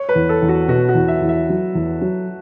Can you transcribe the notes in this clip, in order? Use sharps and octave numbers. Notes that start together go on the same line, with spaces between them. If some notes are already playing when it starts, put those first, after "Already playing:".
Already playing: C#5
B4
E2
A4
E2
F#4
B2 F#4
F#4
E2
E5
E2
E5
F#3
E2
F#3